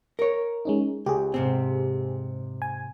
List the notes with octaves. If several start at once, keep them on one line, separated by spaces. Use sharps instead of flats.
A#4 C#5
G#3 C#4 D#4
C#2 G4 G#4
G#2 C3 C4
G#5